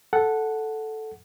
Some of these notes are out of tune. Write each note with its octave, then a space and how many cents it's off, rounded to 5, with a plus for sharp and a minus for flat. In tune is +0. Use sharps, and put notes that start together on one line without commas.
A4 -5 F#5 +0